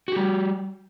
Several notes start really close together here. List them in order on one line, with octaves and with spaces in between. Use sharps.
F#4 G4 G3